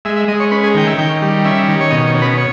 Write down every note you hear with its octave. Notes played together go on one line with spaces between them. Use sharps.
G#3 E5
E5
G#3 D#5
C#5
C#4 B4
G#4
D#3 G5
E5
D#3 G5
G3
C#4 E5
D#3
C#5
B2 D#5
C#5
C#4
B4
C#5